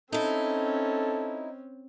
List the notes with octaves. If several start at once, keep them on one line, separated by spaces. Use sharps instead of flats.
C4 C#4 D#4 E4 A4